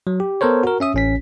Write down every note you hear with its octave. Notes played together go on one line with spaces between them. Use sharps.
F#3
G4
B3 A4 A#4 C5 C#5
F#4 A#4
C#4 E5 D#6
A1 C#4 B6